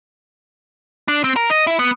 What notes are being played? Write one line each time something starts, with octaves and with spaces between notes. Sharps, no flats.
D4
C4
A#4
D#5
E4
B3